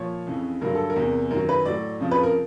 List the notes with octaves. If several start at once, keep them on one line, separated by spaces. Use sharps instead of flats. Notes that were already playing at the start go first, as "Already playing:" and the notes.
Already playing: A#2 F3 C#5
F2 C#3 E3
G2 D3 F#3 A#4
A4
A#4
E2 C3 E3
F#2 D#3 F#3 A#4
B4
A2 F#3 D5
F2 C#3 F3
B4
A#4